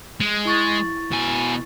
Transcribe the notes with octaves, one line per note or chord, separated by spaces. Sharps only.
G#3
E4 C#6 A6
B2 G#5